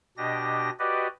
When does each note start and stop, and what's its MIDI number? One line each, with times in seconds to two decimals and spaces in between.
0.17 0.70 47
0.17 0.70 62
0.17 0.70 67
0.17 0.70 75
0.17 0.70 94
0.79 1.08 66
0.79 1.08 67
0.79 1.08 71
0.79 1.08 74
0.79 1.08 75